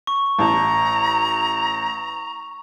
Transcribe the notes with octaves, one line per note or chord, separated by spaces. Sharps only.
C#6
A1 A5 A#5